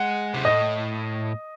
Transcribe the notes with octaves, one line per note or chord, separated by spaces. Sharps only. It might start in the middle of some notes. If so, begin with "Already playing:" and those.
Already playing: G#3 F#5
C3
A2 D#5